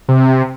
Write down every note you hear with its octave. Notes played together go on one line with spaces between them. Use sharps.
C3